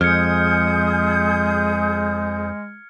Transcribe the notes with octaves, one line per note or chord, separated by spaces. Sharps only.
F2 G#3 G#4 D#6 F6 G6 G#6 C#7